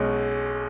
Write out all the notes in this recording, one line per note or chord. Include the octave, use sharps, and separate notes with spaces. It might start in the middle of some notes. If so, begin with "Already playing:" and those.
Already playing: B1 B2 G#3 C#4